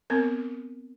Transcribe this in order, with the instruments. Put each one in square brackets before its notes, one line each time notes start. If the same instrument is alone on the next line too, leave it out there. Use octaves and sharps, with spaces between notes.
[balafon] B3 C4 A#4